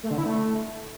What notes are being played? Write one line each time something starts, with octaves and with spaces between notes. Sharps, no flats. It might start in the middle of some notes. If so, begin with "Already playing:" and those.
A3
D3
E4
A3